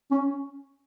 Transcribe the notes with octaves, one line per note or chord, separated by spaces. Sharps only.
C#4